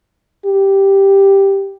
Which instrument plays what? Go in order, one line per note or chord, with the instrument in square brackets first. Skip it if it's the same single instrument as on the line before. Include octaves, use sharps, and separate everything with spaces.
[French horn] G4